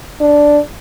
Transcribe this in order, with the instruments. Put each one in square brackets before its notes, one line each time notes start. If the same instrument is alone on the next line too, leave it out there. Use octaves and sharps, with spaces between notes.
[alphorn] D4